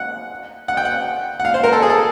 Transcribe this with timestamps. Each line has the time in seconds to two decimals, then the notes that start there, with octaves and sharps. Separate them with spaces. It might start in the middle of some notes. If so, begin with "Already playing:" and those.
Already playing: F#5
0.68 F#5
0.77 G5
0.85 F#5
1.40 F#5
1.45 F5
1.54 C5
1.64 A#4
1.73 A4
1.82 G#4
1.90 A4